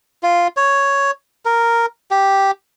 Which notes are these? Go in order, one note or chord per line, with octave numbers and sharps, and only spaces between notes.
F4
C#5
A#4
G4